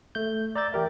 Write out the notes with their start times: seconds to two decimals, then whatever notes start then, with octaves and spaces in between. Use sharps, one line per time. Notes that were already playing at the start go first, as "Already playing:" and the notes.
0.15 A3 G6
0.56 D5 A#5 E6 G6 A6
0.73 E3 G4 A#4 E5